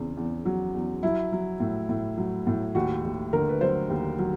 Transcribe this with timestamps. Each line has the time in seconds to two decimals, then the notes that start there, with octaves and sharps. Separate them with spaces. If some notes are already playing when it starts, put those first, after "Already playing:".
Already playing: E2 C#3 C4
0.17 E2
0.45 F#3
0.74 E2
1.03 F#3 E4
1.32 F#3
1.60 A2
1.89 A2
2.18 F#3
2.47 A2
2.75 D#2 F#4
3.04 D#2
3.33 D3 A#4
3.49 B4
3.61 F#3 C5
3.90 D#2
4.19 F#3